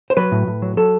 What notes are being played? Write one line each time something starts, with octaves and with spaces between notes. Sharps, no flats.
C5
F#3 B4
A2
A2
F#3
F#3 A4